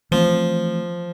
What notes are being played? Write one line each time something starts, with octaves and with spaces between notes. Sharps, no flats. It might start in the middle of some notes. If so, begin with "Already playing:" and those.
E3 F3 A3 C4